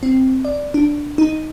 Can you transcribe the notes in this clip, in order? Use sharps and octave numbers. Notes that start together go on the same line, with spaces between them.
C4
D5
D4
D#4